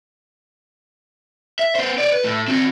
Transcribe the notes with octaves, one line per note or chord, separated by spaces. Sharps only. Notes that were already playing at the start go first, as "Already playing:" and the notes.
E5
B3 C5
C#5 D5
B4
A2
C4 F#4